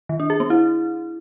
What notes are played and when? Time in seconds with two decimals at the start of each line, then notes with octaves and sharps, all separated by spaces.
0.09 D#3
0.20 D4
0.30 G#4
0.40 B3
0.50 E4